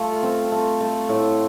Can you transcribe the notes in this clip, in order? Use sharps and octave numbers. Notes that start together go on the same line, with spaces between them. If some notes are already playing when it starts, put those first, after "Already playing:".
Already playing: A3 F4
C4
A3
A3
A2